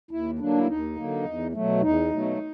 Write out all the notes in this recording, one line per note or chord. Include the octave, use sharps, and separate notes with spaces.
D#2 E4
D3 F#3 A#3 D4
E4
D#2 D#4
D3 F#3 A#3
E2
B2 F#3 A3
E2 D#4
B2 F#3 A3